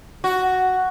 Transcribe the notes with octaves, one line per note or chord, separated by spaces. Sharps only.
F#4